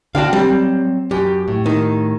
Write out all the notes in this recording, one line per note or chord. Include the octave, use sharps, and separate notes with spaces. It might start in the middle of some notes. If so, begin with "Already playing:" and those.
D3 F#4 D5 F5 G5 A5
F#3 G3 C4
F#2 G4
A2
D#3 D#4